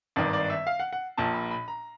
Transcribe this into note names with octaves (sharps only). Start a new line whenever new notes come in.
G#1 G2 D#3 D5
D5
E5
F5
F#5
F#5
A#1 A#2 A5
B5
B5
A#5